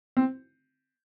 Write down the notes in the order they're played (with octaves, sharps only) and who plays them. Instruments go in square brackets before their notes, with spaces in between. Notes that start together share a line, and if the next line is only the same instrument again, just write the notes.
[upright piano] C4